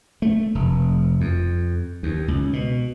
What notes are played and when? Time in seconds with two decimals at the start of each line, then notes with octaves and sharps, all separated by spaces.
0.22 A3
0.55 F1
1.21 F2
2.03 D#2
2.28 C#2
2.53 B2